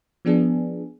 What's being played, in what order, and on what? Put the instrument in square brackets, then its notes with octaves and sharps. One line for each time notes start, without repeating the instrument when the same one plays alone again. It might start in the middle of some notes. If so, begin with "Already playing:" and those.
[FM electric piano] F3 B3 D4 G#4